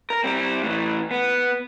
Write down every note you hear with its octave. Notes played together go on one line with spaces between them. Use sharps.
A#4
G3 C4
A2 E3
B3